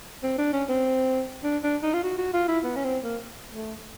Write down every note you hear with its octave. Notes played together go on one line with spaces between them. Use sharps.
C4
D4
C#4
C4
D4
D4
D#4
F4
F#4
F#4
F4
E4
B3
C#4
C4
A#3
A3